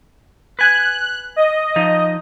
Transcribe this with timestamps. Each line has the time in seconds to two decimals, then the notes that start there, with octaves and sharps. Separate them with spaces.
0.59 B4 G#5 F#6
1.36 D#5
1.76 F3 D#4